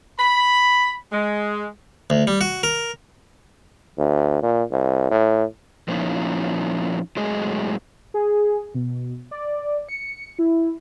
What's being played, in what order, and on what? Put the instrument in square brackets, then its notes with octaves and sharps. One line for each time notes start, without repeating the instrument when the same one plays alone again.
[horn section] B5
G#3
[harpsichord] D2
G3
F#4
A#4
[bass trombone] D2
A#2
C2
A2
[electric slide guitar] A#2 F3 A#3 C#4 D#4 E4
A2 F#3 G#3 G#4 D#5
[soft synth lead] G#4
B2
D5
C#7
E4